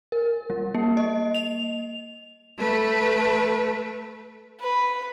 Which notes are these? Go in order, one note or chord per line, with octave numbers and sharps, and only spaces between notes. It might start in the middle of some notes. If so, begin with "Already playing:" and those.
A#4
G3
A#3
D#5
F7
A3 B4
B4